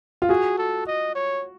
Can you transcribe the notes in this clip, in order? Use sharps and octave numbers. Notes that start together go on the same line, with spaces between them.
F4
F#4 G#4
A4
D#5
C#5